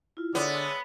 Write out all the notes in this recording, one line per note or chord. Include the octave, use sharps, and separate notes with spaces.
E4 F4
D3 G#3 B3 D4 C#5 E5